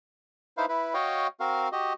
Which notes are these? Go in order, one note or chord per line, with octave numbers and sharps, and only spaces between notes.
D#4 E4 B4 C5 F5
E4 B4
F#4 C#5 D#5 F5 G5
C4 F#4 A#4 F5
F#4 G4 D#5